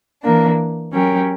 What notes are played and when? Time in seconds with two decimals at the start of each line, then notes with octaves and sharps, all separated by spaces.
0.22 E3 A#3 D4
0.92 F#3 C#4 G4 A#4